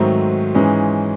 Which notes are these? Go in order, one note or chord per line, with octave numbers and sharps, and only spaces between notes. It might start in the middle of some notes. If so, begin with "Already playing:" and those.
Already playing: G#2 D#3 F#3 A3 C4
G#2 E3 G#3 C#4